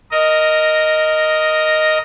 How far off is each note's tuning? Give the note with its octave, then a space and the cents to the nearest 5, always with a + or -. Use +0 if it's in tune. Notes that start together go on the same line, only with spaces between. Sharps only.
A#4 -5 D#5 +0